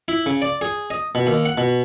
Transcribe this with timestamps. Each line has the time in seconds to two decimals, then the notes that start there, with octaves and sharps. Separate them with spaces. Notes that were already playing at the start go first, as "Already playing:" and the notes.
0.08 E4
0.26 C#3
0.42 D5
0.61 G#4
0.90 D#5
1.15 B2
1.27 D#2
1.45 F#5
1.58 B2